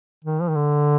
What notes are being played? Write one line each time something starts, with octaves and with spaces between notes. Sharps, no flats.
D#3
F3
D#3
D3